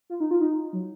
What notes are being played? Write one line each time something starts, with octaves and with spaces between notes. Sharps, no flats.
F4
D#4
F4
D#4
F#3